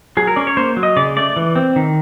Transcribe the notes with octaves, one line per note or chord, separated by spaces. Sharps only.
F#3 G#4
A#4
C#4 D5
C#5
A#3 C5
F#3
D#5
C#3 D5
A3 D5
E3
C4
D#3